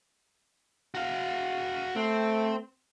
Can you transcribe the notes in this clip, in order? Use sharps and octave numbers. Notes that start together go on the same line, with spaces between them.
F#4 F5
A3 C4